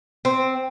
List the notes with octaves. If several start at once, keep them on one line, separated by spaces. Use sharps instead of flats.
C4